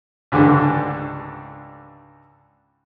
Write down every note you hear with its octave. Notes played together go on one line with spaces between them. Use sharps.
C#2 G#2 D3 D4 G4